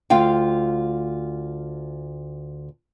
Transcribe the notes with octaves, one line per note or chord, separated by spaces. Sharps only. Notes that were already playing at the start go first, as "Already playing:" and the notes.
D2 F4 F5 G5